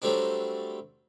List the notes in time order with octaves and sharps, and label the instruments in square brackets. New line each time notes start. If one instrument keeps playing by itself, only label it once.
[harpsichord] F#3 G3 A3 C4 D4